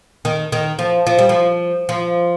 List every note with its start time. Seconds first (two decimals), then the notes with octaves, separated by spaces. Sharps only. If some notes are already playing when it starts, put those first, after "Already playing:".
0.25 D#3
0.52 D#3
0.79 F3
1.07 F3
1.19 G3
1.29 F3
1.89 F3